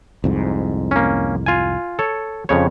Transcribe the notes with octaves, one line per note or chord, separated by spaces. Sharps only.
C2 F2 G#2
A#3 C#4
F4 G#5
A4 C#5
F2 C#3 C#5